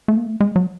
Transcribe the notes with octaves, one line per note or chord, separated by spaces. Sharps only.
A3
A#3
A3
G#3
F#3